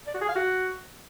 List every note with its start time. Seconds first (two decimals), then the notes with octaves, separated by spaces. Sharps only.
0.07 D5
0.14 F#4
0.21 G#4
0.28 F5
0.36 F#4